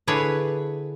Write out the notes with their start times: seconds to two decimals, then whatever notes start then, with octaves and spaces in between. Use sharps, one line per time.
0.07 D3 D4 E4 G#4 B4 C#5